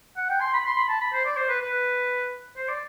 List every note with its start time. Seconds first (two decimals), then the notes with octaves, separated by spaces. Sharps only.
0.17 F#5
0.29 G5
0.40 C6
0.54 B5
0.66 C6
0.77 B5
0.88 A5
1.01 B5
1.13 C5
1.25 D5
1.37 C5
1.49 B4
1.61 B4
2.57 C5
2.68 D5